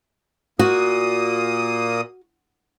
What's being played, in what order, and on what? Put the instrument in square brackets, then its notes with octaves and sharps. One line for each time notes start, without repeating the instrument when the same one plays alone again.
[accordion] A#2 A#3 D#6 [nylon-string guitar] F#4